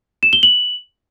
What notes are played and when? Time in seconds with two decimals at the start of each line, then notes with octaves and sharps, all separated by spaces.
0.23 E7
0.33 G7
0.43 F#7